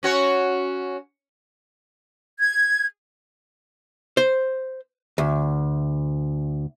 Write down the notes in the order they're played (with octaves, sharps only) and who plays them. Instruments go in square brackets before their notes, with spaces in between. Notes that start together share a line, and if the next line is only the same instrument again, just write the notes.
[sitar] C#4 F#4 C#5
[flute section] G#6
[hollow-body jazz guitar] C5
D2